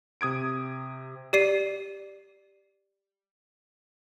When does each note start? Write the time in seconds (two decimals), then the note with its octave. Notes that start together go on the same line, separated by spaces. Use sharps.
0.21 C3 D#6 G#6 D7
1.33 G4 D5 C7 D#7